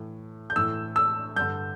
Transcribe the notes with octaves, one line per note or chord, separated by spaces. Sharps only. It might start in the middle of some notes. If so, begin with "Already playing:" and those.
Already playing: A2 E3
G6
A2 E3 E6
E6
G2 D3 G6